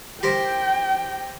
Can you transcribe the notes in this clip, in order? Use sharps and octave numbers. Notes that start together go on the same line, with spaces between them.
G4 A#4 C5 G5